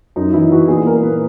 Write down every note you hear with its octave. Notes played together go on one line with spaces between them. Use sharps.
F#2 D#4
E3 E4
E3 F#4
A#2 G#4
A#2 A#4
A#2 B4